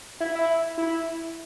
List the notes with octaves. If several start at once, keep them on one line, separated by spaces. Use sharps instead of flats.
E4
E4
E4